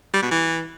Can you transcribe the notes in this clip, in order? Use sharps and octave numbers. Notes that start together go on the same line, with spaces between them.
G3
B2
E3